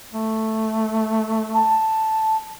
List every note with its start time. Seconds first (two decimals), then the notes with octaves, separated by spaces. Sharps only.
0.13 A3
1.54 A5